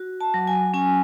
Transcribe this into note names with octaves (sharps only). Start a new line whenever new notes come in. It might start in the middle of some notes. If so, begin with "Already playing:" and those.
Already playing: F#4
A5
F#3
G#5
C#4 G#5